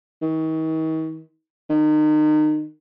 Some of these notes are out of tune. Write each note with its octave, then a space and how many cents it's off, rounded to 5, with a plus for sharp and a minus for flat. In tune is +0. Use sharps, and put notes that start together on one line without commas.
D#3 +40
D#3 -30